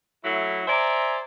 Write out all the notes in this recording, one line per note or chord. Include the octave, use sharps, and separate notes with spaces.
F#3 A3 E4
C5 D5 E5 G#5 A#5